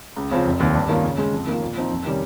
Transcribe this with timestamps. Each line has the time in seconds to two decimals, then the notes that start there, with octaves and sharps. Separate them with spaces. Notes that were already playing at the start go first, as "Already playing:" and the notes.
0.16 C#2
0.31 C#3 F3 C4 F4
0.46 F1
0.60 D#2 D#3
0.74 G2
0.89 D#3 A#3 C#4 F4
1.04 C#3
1.18 G#3 C#4 G#4
1.33 F2
1.47 D#3 A#3 F4
1.61 A#2
1.76 F3 C4 D#4
1.90 F2
2.04 C3 D#3 G3 C#4